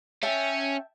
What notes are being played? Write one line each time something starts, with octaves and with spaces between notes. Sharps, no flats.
C#4 E5 G5 A5